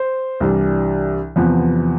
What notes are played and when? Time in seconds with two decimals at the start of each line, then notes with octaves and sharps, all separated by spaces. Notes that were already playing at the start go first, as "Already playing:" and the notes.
Already playing: C5
0.40 C2 C3 E3 G3 D4
1.36 E2 C3 F3 B3